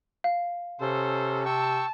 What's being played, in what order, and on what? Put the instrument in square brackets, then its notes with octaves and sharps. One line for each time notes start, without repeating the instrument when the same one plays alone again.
[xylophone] F5
[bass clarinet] C3 [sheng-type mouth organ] C#4 A4 [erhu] C5
[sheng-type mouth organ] G5 C#6 E6 [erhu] A5